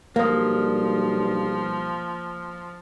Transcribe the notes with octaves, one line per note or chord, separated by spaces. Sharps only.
B1 G2 F3 A#3 F5 D#6